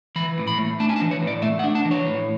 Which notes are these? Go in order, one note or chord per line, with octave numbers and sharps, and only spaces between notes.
E3 B5
A2
B5
A3
D4 A5
G#5
A5
E3
C#5
A2
D5
A3 E5
F#5
D4
A5
E3
C#5
A2